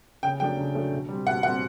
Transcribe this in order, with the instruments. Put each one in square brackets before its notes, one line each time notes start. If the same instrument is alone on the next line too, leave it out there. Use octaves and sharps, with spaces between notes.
[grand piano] C#3 [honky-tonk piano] G5
[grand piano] F#3 A3 D4 [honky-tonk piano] G5
[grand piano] C#3
F#3 A3 D4
B2
G3 C4
[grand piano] B2 [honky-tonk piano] F#5
[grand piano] G3 C4 [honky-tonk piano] F#5